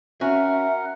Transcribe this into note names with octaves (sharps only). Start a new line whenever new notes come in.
C#4 F#4 A#4 E5 F#5